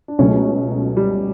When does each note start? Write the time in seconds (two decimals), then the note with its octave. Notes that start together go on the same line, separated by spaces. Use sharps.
0.08 D4
0.18 C#2 B2 F#3 A3 C#4
0.97 G3